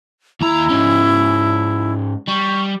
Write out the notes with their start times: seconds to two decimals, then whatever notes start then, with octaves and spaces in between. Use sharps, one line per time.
0.41 D#2 E4 A#5
0.70 G#2 C#4
2.28 G3 C#6